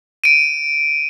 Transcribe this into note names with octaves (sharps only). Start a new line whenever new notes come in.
D7 D#7